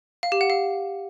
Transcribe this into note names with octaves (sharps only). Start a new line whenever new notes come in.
F5
G4
F#5
F5